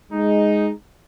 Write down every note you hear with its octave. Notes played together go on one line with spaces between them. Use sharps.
G#3 D#4